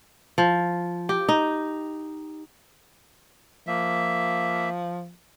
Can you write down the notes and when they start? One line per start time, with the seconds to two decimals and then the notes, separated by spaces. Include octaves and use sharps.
0.38 F3
1.09 G4
1.29 D#4
3.67 F3 A#3 E5